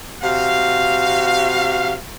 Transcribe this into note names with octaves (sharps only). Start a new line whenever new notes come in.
C3 F#4 F5